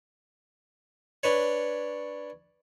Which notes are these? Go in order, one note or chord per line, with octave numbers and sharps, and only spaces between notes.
D4 B4 C#5